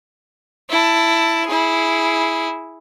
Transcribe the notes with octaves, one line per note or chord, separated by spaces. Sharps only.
E4 A5
E4 G#4